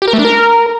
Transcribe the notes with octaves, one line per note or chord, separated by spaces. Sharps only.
G4
A#4
A3
D4
A#4